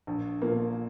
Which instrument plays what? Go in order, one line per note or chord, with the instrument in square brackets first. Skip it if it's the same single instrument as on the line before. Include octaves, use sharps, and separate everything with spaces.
[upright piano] A#1
A#2 F3 A#3